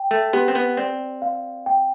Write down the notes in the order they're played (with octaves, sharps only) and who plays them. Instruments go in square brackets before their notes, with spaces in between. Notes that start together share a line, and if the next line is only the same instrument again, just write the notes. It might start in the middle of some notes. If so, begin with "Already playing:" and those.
Already playing: [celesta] G5
[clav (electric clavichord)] A3
[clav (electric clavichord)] B3 [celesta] G4
[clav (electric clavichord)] C4
B3
[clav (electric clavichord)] C4 [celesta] D5
[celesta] F5
G5